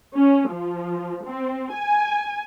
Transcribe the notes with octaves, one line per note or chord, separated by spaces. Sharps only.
C#4
F3
C4
G#5